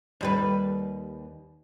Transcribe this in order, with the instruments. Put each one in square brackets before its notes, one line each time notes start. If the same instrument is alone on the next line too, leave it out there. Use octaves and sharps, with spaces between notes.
[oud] D#2 G3 B4